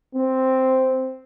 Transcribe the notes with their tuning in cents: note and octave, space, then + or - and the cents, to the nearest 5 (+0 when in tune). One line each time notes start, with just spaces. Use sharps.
C4 +0